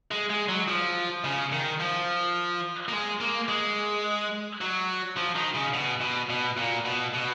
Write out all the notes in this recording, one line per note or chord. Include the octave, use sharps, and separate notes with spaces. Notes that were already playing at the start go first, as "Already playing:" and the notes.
G#3
G#3
F#3
F3
C#3
D#3
F3
A#3
G#3
A#3
G#3
F#3
F3
D#3
C#3
B2
B2
B2
A#2
B2
B2